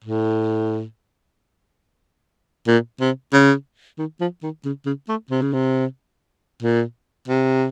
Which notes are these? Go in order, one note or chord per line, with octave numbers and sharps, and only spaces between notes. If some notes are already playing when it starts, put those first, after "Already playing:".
A2
A#2
C3
C#3
D#3
F3
D#3
C#3
C#3
A3
C3
C#3
C3
A#2
C3